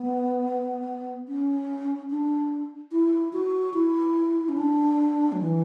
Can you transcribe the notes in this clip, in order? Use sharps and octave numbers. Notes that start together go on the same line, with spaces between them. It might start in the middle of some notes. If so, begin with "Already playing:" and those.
Already playing: B3
C#4
D4
E4
F#4
E4
C#4
D4
F#3
E3